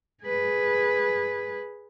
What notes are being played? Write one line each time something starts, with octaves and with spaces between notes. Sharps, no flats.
G#4 B4